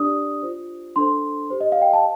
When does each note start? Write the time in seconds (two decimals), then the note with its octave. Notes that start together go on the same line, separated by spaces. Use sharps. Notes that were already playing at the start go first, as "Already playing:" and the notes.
Already playing: D4 G4 D5 D#6
0.43 F4 C5
0.96 D4 A4 C5 C6
1.50 G4 C5
1.61 D#5
1.72 F5
1.82 G5
1.93 A5